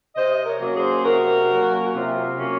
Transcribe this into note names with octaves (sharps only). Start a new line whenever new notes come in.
C3 C5 D#5
A#4 C#5
F#3 A#3 C#4
G#4 C5
C3 F#4 A#4
F#3 A#3 C#4
F#4
C3 F4
F#3 A#3 C#4